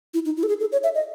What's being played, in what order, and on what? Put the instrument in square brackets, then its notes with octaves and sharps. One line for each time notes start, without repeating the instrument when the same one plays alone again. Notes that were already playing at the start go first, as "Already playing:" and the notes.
[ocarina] E4
D#4
E4
A4
G#4
A4
C#5
E5
D#5